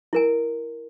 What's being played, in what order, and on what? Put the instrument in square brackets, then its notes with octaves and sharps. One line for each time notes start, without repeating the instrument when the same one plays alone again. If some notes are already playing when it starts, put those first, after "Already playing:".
[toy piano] E4 A#4 G#5